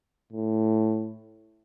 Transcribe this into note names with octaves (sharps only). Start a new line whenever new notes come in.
A2